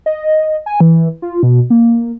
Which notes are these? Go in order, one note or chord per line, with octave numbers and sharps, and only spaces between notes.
D#5
G#5
E3
F4
B2
A#3